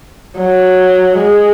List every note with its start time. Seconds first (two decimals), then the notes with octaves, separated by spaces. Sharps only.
0.37 F#3
1.18 G#3